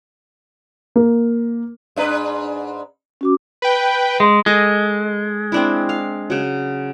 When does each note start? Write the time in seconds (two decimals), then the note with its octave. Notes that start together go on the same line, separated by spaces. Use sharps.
0.96 A#3
1.96 G#2 D4 B4
3.21 C#4 F#4 D6
3.62 B4 G5
4.20 G#3
4.46 G#3 A4 D#5
5.52 C4 D4 E4
5.89 F5
6.30 C#3 F#3